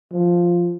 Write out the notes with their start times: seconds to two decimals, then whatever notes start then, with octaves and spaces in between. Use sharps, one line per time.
0.12 F3